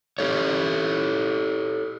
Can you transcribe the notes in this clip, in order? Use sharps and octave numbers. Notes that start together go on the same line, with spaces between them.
G4 A4 C#5